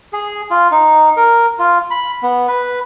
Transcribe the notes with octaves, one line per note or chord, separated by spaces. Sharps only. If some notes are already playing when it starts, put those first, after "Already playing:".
G#4
F4
D#4
A#4
F4
B5
B3
B4